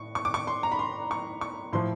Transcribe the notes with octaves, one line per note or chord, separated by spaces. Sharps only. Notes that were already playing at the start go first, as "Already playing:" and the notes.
Already playing: A2 C#6
C#6
D6
C#6
C6
A#5
B5
C6
C#6
C#6
A2 F3 C6